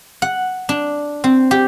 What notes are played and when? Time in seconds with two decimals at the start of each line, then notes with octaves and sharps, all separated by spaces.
0.22 F#5
0.69 D4
1.24 C4
1.51 G4